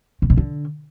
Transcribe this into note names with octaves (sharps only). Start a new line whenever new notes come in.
A2
A#2
D3